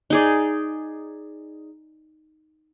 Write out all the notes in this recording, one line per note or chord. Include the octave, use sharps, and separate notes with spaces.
D#4 G#4 D5